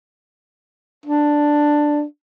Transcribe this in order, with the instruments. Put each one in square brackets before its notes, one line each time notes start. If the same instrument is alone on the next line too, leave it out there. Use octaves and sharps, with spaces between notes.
[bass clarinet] D4